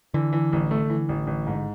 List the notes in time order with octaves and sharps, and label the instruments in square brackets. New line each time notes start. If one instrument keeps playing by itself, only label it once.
[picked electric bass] D3 [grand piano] E3
[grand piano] E3
A1
A3
E3
A1
A1
G#2